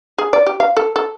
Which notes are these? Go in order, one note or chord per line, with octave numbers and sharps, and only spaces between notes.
G#4
D5
G4
F5
A4
A4